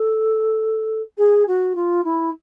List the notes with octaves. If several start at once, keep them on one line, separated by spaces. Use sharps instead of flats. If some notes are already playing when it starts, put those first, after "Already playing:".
Already playing: A4
G#4
F#4
F4
E4